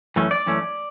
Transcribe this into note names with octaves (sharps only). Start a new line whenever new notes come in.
F#2 E3 A3 C#4
D5
F#2 E3 A3 C#4